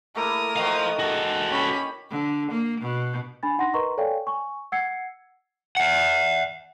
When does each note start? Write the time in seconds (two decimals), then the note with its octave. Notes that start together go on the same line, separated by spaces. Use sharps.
0.15 A3 A#3 E4 A#4 D#6
0.56 D#3 E4 F#4 C5 F5
0.99 F#4 G#4 A4
1.51 C#4 G4 B5
2.10 D3
2.51 A#3
2.80 B2
3.43 D4 G#5 B5 A6
3.58 D#4 F#5 C6 A#6
3.74 A#4 B4 D#5 A#5 C6 C#6
3.98 A4 C#5 D5 F5 G5 G#5
4.27 G#5 C#6
4.72 F#5 E6 G#6 C7 C#7
5.77 E5 F#5